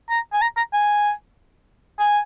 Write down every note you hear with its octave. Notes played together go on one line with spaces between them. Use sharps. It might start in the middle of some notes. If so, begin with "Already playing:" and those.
A#5
G#5
A#5
A#5
G#5
G#5